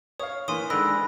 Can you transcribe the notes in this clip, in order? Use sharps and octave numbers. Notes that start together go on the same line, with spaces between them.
C#5 F5 D#6
E3 A#3 A#4 G#5 C6 D#6
G#2 D3 D#3 B5 E6 F#6 A#6 D7